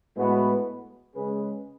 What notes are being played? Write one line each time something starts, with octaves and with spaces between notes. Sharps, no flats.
A2 G#3 B3 F#4 B4
C#3 G#3 C#4 G#4 B4